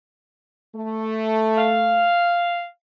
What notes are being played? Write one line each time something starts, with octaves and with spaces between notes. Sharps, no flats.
A3
F5